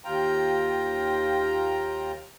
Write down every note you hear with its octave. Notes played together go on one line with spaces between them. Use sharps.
D#2 F4 G5 A#5